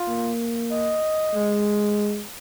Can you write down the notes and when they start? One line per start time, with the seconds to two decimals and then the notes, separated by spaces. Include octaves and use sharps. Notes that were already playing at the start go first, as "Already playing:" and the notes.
Already playing: F4
0.08 A#3
0.72 D#5
1.35 G#3